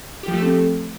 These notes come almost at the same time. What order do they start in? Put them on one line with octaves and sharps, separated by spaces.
G4 F3 A3 A4 C4